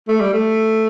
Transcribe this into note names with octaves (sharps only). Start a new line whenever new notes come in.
A3
G3
A3